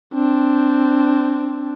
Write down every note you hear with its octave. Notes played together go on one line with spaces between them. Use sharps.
C4 D4